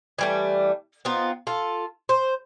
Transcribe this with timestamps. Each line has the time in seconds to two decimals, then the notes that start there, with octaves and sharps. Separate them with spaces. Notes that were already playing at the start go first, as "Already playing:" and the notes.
0.18 E3 G3 A3
1.05 B3 C4 D#4 F4
1.47 F4 A4
2.09 C5